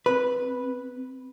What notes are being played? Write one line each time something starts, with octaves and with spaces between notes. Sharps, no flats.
C4 B4